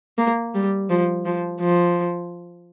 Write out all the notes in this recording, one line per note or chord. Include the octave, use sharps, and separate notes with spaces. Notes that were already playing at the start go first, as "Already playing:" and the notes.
A#3
G3
F3
F3
F3